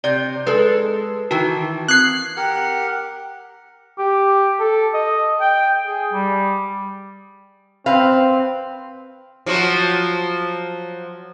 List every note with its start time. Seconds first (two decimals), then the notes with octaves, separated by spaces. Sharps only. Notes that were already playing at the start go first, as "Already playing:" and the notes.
0.04 C3 D5 G6
0.47 G#3 A4 B4
1.31 D#3 E3 F#4 G5 A5
1.88 C4 D#6 F#6 G#6 C7
2.37 G4 A#4 F#5
3.98 G4
4.60 A4
4.94 D#5
5.41 G5
5.87 G#4
6.13 G3
7.86 C4 B4 F5
9.46 F3 F#3 F#4